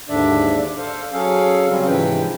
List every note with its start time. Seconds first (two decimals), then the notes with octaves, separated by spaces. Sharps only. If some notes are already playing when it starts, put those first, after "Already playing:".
0.09 D#2 G#2 D3 D4 D5 E5
0.59 D5
0.78 A4 C5 F5
1.13 F#3 C#4 G#4 A4 F5
1.68 C#3 F#3 G3 C4 C#4
1.87 G#2 C3 E3 F3 B4 G5